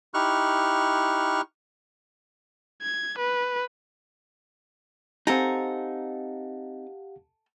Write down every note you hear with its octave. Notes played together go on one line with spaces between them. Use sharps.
D#4 E4 G4 C#6 F6 F#6
G#6
B4
C4 D#4 G4 A4 F5 F#5 G#5 A#5